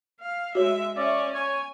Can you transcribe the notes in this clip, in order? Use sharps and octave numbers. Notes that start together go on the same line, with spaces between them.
F5
G#3 F#4 C#5 E5
C#4 C#5 D5 E5
C#5 G#5